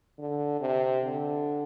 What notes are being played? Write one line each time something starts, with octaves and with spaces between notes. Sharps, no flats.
D3
C3
D3